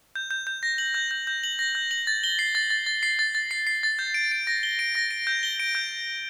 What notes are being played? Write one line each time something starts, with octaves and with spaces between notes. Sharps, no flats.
G6
G6
G6
A#6
F#7
G6
G6
G6
F#7
A#6
G6
F#7
A6
G7
C7
A6
A6
A6
C7
A6
A6
C7
C7
A6
G6
D7
D7
A#6
G7
D7
A#6
D7
G6
G7
D7
G6